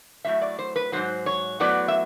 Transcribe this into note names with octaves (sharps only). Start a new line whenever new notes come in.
A2 F#3 A3 E5
D5
C5
B4
G#2 D#3 F#3 C5
C#5
A2 F#3 B3 D5
E5